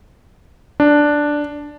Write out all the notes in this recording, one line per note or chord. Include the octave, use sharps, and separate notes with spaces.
D4